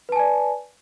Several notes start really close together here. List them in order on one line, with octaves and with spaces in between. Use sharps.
B4 A5 G#5 D5